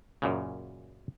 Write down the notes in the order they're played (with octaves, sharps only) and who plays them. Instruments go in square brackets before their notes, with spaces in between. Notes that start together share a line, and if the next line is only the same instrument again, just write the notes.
[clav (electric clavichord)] F#2 A#2 C#3